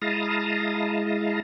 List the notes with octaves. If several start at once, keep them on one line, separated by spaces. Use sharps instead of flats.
G#3 E4 F5 A5 A#5 D#6